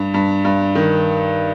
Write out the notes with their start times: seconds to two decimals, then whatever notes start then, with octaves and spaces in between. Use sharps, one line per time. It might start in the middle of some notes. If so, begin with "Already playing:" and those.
Already playing: G2
0.14 G2
0.45 G2
0.75 D#3